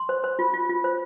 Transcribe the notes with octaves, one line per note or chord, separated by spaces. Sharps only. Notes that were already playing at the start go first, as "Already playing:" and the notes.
Already playing: C6
C5
C5
F4
F4
F4
C5